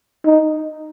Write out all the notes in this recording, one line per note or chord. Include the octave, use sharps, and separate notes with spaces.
D#4